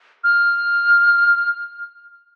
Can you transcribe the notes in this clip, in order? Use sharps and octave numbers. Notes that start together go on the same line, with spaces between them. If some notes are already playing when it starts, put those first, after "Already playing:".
F6